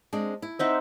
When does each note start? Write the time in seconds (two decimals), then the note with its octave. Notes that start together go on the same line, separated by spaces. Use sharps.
0.13 G#3 C4 D4
0.42 E4
0.59 C4 D#4 E5 F#5